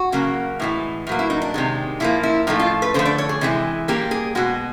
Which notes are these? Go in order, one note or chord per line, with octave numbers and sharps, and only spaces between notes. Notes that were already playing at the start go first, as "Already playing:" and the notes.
Already playing: F#4
C#3 F#3 A#3
A2 E3 G#3
A2 F#3 A#3
E4
D#4
D4
C3 D#3 G#3
A#2 F3 A#3 E4
E4
A2 F3 A3 D#4
F4
B4
D3 F3 A3 C5
D5
C#5
G#4
C3 E3 G#3
A#2 G3 A#3 G4
G#4
B2 G#3 F#4